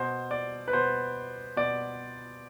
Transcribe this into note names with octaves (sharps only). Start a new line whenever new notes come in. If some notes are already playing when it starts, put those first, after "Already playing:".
Already playing: B2 C5
D5
B4
B2 C5
B2 D5